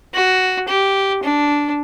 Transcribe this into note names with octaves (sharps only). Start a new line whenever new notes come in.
F#4
G4
D4